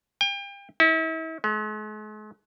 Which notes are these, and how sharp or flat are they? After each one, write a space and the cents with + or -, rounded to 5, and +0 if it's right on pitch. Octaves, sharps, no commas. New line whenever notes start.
G5 +35
E4 -40
G#3 +45